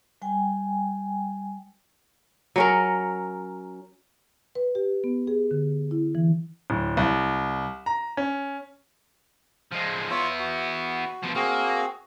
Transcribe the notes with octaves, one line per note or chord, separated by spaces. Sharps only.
G3 G5 G#5
F#3 C#4 A#4
B4
G4
B3
G#4
D3
E4
E3
D1
C2
A#5
C#4
F3 G#3
B3 E4 F4 C#5
F#4
B2 F3
A#3 C4 F#4 G#4